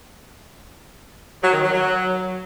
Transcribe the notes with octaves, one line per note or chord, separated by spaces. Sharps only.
F#3
D#3
F#3
F#3